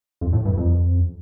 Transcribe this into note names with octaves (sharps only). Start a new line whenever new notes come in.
F2
A2
G2
F2